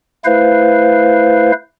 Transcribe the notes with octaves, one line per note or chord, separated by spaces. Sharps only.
A3 E4 B4 C5 F5